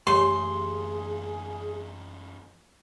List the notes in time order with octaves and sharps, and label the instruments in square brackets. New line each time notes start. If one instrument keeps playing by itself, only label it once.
[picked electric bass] F#2 E3 A3 [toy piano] G4 C#5 [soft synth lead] G#4 [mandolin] C6